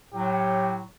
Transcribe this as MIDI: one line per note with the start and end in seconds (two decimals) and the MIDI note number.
0.14 0.83 45
0.14 0.83 54
0.14 0.79 67